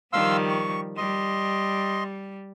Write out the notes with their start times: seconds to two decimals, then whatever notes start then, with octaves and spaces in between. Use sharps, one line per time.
0.13 D#3 F3 G3 F5 C6 E6
0.49 C#6
0.97 G3 D#5 C6